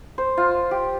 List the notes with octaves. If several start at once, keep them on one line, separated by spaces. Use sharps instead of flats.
C5
F4
G4